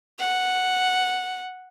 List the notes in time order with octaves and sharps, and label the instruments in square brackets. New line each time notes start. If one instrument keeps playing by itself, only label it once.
[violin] F#5